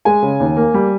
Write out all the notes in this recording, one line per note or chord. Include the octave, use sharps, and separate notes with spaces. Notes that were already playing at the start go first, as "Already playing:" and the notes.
G#3 G#5
C#3
D#2
A#3
G3